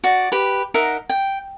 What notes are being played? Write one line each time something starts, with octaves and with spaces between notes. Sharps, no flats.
F#4 D5
G4 B4
D#4 A#4 E5 F#5
G5